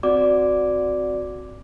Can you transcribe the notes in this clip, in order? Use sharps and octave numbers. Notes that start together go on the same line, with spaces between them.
C4 F#4 D5 D6